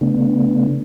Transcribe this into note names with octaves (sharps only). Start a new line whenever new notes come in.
C#3 A3 B3 D4